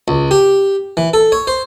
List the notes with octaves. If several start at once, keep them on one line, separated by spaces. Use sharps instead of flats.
C#2
G4
E3
A4
C#5
C5